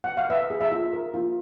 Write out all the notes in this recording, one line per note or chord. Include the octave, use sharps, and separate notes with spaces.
F#5
F5
B4 E5
G#4
E5
F4
A#4
F4